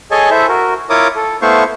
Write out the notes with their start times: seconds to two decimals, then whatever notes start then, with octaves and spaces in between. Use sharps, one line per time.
0.11 G#4 A4 C#5 D#5 G#5 A5
0.30 E4 A4 C5 E5
0.49 F#4 A#4
0.90 E4 F4 A#4 C#5 D6 D#6
1.16 A4
1.42 A3 B3 E4 C5 F5 C#6